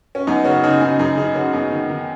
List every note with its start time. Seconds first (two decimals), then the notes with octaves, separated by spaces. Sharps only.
0.15 C#4
0.27 F#2 B3 D#4
0.44 C#3 C#4 F#4
0.63 C#3 D#4 G#4
0.81 C#3 D#4 G#4
0.99 F#2 D#4 G#4
1.17 C#3 D#4 G#4
1.35 C#3 C#4 F#4
1.53 F#2 B3 D#4
1.72 D#3
1.89 D#3